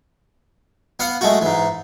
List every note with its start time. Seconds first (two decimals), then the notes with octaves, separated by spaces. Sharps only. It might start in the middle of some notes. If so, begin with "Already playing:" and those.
1.00 B3 F5 F#5
1.21 G#3 A3 F#4
1.42 G#2 E3